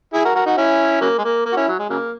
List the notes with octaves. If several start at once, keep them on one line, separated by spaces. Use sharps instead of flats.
E4 G#4
F#4 A#4
F#4 A#4
D#4 F#4
C#4 E4
C#3 F#3 A#3
G#3
A#3
A#3
F#4
C#4 E4
F#3
G#3
C#3 F#3 A#3